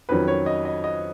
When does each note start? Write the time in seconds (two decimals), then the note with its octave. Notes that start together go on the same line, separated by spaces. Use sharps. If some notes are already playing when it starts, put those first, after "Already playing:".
0.09 F2 D#3 F#3 C#4 B4
0.28 C#5
0.46 D#5
0.65 D#5
0.84 D#5